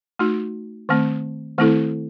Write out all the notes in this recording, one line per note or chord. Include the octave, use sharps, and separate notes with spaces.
A3 D#4 F#4
D#3 A3 C4
D#3 A3 C4 E4 A4